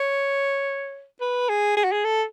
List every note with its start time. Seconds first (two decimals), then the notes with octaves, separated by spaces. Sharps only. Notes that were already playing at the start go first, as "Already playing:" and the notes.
Already playing: C#5
1.21 B4
1.49 G#4
1.77 G#4
1.84 F#4
1.92 G#4
2.04 A4